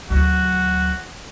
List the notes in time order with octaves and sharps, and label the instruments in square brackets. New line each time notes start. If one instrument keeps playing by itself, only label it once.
[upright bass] D2 F#3 [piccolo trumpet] F#4